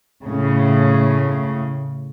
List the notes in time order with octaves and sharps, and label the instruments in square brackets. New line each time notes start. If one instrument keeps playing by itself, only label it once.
[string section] A2 C#3